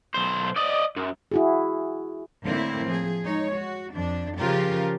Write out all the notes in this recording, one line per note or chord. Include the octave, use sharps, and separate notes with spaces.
B1 C5
D5 D#5
F#2
E4 F#4 G#4
A2 D3 A#3 C4 E4
F3 G#4
G#3 D#4 C#5
F#4
F2 D4
C#3 F3 F4 G4 A#4